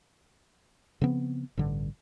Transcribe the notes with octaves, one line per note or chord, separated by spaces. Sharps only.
C#3 F3 B3 C4
A1 G2 D3